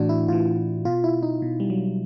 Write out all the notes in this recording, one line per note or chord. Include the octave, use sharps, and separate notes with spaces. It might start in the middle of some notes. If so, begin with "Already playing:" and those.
Already playing: A2 E3 D4 F#4
E4
A2 E3 F4
B2 F4
E4
D#4
B2
G3
F#3